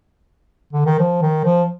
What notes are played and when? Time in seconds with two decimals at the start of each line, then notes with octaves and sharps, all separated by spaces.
0.73 D3
0.86 D#3
0.99 F3
1.22 D#3
1.44 F3